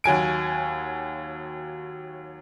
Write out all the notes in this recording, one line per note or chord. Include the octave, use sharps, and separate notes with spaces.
D#2 F#3 G#5 D7